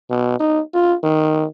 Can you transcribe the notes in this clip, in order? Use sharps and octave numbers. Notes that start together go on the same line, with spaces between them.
B2
D#4
F4
D#3